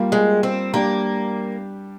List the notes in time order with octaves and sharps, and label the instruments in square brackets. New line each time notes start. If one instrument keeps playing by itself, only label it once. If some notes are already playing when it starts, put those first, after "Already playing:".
Already playing: [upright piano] G3 A#3 F4
[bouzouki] G#3
C4
[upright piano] G3 D4 G4 [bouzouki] A#3